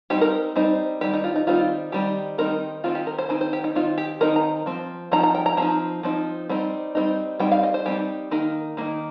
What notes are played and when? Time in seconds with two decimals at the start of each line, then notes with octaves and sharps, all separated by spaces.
0.10 G3 C4 D#4 G4
0.21 A#4
0.56 G3 C4 D#4 C5
1.01 D#3 G3 C4 D#4 G4
1.13 D#4
1.24 F4
1.36 D#4
1.47 D#3 G3 C4 D#4 F4
1.92 D#3 G3 C4 D#4 G4
2.38 D#3 G3 C4 D#4 A#4
2.84 D#3 C4 D#4 F4
2.95 G4
3.07 A#4
3.18 C5
3.29 D#3 C4 D#4 C5
3.41 C5
3.53 G4
3.64 D#4
3.75 D#3 C4 D#4 F4
3.98 G4
4.21 D#3 C4 D#4 A#4
4.36 A#5
4.66 F3 C4
5.12 F3 C4 D#4 A#5
5.23 A#5
5.35 G5
5.46 A#5
5.57 F3 C4 D#4 A#5
6.03 F3 C4 D#4
6.49 G3 C4 D#4
6.95 G3 C4 D#4
7.40 G3 C4 D#4 G5
7.51 F5
7.63 D#5
7.74 C5
7.86 G3 C4 D#4 G4
8.31 D#3 A#3 D#4 A#4
8.77 D#3 A#3 D#4